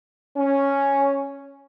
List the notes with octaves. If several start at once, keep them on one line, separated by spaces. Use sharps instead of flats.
C#4